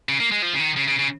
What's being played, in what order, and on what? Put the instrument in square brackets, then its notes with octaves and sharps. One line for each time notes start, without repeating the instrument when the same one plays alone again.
[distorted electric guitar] C#3
A#3
G#3
F3
C#3
D#3
C#3
C#3
C#3